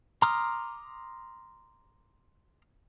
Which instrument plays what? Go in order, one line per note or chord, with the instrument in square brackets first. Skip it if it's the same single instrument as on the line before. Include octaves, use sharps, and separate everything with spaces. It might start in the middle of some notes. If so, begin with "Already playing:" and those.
[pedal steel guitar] A#5 C6 D6 D#6 F6